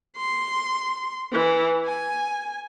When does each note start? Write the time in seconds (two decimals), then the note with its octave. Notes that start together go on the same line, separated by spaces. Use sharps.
0.16 C6
1.32 E3
1.85 G#5